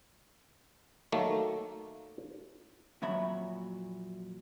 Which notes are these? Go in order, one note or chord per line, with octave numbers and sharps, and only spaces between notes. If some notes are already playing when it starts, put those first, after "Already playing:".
D#3 F#3 A3 A#3
F2 A#2 F#3 E5 B5